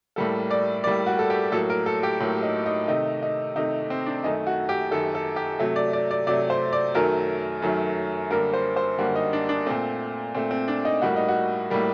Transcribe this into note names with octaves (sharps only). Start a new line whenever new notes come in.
A2 G3 A#3 A4
D5
A2 G3 A#3 D5
F#4
A4
G4
A2 F#3 A#3 A4
A#4
A4
G4
A2 F#3 A#3
D#4
D#4
C3 D#3 A3 D#4
D#4
C3 D#3 A3 D#4
C4
D4
F#2 D#3 A3 D#4
F#4
G4
F#2 D#3 A3 A4
A4
G4
C3 F#3 A3
D5
D5
D5
C3 F#3 A3 D5
C5
D5
F#2 D#3 F#3 A3 A#4
F#2 D#3 F#3 A3
F#2 D3 G3 A#3 A#4
C5
C5
F#2 D3 G3 A#3 F#4
D#4
D4
D4
A#2 A3 C4
A#2 A3 C4
C4
D4
D#4
A2 G3 A#3 F#4
D#4
F#4
A2 G3 A#3